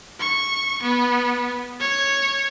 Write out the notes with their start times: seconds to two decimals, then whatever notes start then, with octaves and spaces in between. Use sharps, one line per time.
0.20 C#6
0.83 B3
1.80 C#5